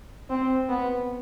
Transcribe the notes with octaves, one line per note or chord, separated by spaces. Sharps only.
C4
B3